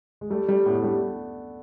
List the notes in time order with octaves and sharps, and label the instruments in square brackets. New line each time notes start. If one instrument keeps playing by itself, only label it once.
[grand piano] G#3
[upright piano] G3 [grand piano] A3
[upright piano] G3
[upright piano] A2 [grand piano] B3
[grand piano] A3
[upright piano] G3 [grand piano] D4